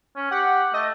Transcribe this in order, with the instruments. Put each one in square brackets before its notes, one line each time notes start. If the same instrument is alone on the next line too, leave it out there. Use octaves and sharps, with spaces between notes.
[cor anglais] C#4
[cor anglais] G4 [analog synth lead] F#5
[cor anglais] A3 [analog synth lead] D#5